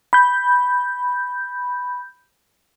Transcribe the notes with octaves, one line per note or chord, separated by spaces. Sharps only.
B5 G6